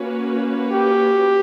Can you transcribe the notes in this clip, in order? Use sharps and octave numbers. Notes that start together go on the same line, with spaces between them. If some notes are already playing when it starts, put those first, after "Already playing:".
Already playing: A#3 C#4 F#4 B4
G4